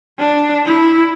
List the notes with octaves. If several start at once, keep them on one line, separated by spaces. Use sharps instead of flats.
D4
E4